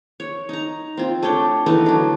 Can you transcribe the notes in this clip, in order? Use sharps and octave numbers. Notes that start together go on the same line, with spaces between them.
C#5
D#4 A#5
C4 F4
A3 D4 C#5 G5
E3 A3 B3 D#4
D3 F#3